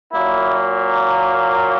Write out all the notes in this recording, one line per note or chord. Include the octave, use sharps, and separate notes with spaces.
A#2 F#3 A#3 E4